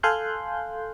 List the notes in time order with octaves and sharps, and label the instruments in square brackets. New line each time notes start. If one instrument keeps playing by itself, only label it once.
[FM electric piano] A4 F5 G#5 C6 F#6 G6